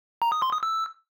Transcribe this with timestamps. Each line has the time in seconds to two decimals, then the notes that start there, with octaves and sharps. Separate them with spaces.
0.22 A#5
0.32 D#6
0.42 C6
0.52 D#6
0.63 E6